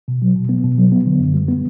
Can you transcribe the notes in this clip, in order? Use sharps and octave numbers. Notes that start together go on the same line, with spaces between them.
B2
F#3
B2
B3
B2
F#3
B3
D3
F#2
G3
B3